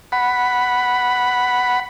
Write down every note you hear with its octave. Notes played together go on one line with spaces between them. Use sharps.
F#5 B5